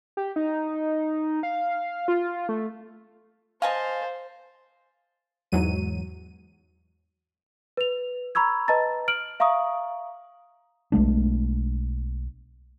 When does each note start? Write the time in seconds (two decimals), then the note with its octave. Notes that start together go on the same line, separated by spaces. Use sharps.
0.17 G4
0.36 D#4
1.43 F5
2.08 F4
2.49 A3
3.62 C5 D#5 F5 G#5 A5
5.52 E2 G#2 F#3 D#7
7.77 B4 F7
8.35 A#5 B5 C#6 E6 G#6
8.68 B4 D#5 A5 A#5 A6
9.08 F6 D7 F#7
9.40 E5 F5 A#5 C#6 D#6
10.92 B1 G#3 A3 D4